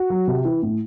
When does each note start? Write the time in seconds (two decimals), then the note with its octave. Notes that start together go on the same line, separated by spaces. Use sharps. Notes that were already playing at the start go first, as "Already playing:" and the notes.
Already playing: F#4
0.10 F#3
0.28 C3
0.45 E3
0.62 A2